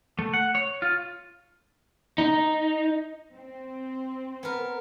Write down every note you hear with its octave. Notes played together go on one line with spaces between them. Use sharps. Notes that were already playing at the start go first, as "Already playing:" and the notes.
A3
F#5
C#5
F4
D#4
C4
B3 A#4